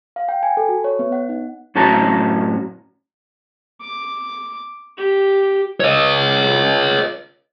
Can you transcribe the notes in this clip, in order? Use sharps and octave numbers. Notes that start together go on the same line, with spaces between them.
F5
G5
G#5
A4
F#4
C#5
B3
F#5
D#4
F#2 A2 C#4 F#4 A5 A#5
D6
G4
C#5 D#5